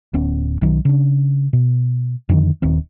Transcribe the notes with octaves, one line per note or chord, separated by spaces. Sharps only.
D1 B3 C#4
B1 D#3 F#3
C#3 D4
B2
F2 D3 D#3
D#1 D#2 C4